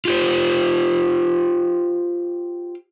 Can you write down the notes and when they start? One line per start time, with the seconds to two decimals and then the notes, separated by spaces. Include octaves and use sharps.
0.05 F4 G4 C5